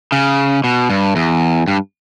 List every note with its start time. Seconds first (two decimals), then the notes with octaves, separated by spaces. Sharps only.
0.12 C#3
0.64 B2
0.90 G2
1.16 E2
1.68 G2